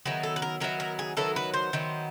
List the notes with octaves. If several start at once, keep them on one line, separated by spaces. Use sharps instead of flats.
D#3 F#3 B3 E4 G#4
A4
B4
A#4
D#3 F#3 B3 E4 A#4
A#4
G#4
D#3 F#3 B3 E4 A4
B4
C5
D#3 F#3 B3 E4